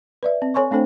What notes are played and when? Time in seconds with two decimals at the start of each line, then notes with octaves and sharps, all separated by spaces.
0.23 B4 D5 E5
0.42 C4
0.54 A4 C#5 G#5 C6 C#6
0.71 A3 C4 D4 A4 C5 G5